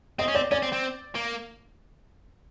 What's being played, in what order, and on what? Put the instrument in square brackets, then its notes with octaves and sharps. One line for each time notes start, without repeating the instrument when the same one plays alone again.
[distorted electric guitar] C4 [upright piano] D#5
[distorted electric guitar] C#4
[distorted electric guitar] C4 [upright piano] D5
[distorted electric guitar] C#4 [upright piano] D5
[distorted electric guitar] C4
C4
A#3